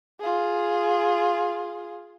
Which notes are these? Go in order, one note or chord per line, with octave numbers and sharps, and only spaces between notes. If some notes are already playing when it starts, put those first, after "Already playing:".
F4 G#4